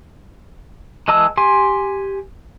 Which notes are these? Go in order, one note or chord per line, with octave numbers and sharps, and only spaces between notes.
E3 G#3 D#5 A5 E6
G4 G#5 C6